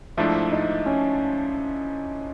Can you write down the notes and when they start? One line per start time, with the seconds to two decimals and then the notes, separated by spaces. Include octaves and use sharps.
0.17 G#2 F3 A3 D4 E4
0.52 D#4
0.86 C#4